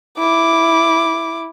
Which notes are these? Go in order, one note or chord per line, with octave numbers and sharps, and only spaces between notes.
E4 D6